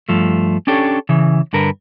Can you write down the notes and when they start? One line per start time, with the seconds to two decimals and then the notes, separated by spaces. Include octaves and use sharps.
0.09 G2 F3 A3
0.67 C#4 D4 G4 A4 C#5
1.09 C#3 E3
1.53 G2 D3 A#4 B4